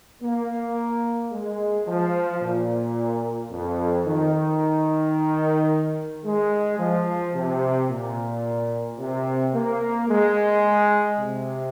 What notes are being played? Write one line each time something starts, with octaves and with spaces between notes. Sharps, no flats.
A#3
G#3
F3
A#2
F2
D#3
G#3
F3
C3
A#2
C3
A#3
G#3
C3